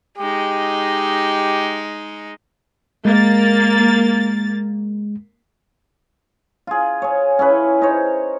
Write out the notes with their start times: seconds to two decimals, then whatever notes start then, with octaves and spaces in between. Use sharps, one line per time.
0.18 G#3 D#4 G4
3.05 G#3 A#3 A6
6.67 F4 G#4
7.02 G#4 C#5
7.39 C#4 E4 G#4 B4
7.82 D#4 C5 C#5